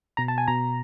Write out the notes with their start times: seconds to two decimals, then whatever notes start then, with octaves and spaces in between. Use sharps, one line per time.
0.17 B2 A#5
0.28 A5
0.38 G#5
0.48 B2 A#5